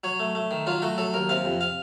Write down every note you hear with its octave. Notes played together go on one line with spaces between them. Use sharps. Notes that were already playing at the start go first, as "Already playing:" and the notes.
F#3 C#5
A3
A3
D#3
F#3 F4
A3 F#4
F#3 A4
D#2 A#4
C3 F5
F2
F5